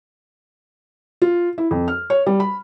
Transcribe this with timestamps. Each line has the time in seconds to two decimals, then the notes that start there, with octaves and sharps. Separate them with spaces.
1.22 F4
1.58 E4
1.71 F2
1.88 F6
2.10 C#5
2.27 G3
2.40 B5